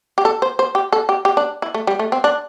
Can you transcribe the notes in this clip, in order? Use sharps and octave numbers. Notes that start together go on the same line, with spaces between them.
G4
A4
C5
C5
G4
A4
G4
G4
D4
E4
A3
G3
A3
C4
D4